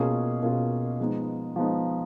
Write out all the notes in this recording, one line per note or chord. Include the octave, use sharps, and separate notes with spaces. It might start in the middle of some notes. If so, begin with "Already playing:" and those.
Already playing: B2 A#3 C#4 F4 G#4
B2 A#3 C#4 F4 G#4
F3 G#3 B3 D#4
F3 G#3 B3 D#4